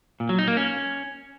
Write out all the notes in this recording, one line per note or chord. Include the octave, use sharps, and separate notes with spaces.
A#2
F#3
D#4
A#3
C#4